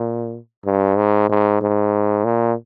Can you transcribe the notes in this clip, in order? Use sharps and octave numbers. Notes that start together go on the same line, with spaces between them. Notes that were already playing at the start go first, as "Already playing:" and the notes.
Already playing: A#2
G2
G#2
G#2
G#2
A#2